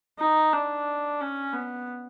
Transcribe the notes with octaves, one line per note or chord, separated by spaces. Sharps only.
D#4
D4
C#4
B3